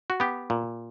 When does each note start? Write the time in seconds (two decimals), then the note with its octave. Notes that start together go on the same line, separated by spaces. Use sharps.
0.10 F#4
0.20 B3 G4
0.50 A#2